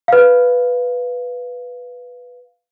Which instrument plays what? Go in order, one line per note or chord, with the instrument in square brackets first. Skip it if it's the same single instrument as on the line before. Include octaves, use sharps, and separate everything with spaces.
[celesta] B4 F5